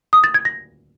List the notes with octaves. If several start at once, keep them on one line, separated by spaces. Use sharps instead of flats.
D#6
A6
G#6
A#6